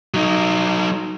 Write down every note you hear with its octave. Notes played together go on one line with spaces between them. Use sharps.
F#3 D#4